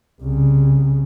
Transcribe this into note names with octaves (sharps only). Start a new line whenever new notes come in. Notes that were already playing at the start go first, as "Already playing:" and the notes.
C2 C#3